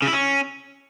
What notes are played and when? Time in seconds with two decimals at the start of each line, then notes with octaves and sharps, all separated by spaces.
0.02 C#3
0.07 E4
0.13 C#4